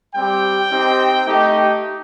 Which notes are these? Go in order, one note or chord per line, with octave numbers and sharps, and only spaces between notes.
G3 C4 G4 G5
C4 D#4 G4
A3 D#4 G4